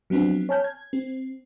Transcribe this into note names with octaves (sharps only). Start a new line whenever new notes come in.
F3 F#3 B3 C4 D4
C#5 G#5 A5 F6 G6
G#6
C4